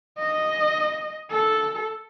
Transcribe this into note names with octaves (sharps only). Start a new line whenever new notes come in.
D#5
A4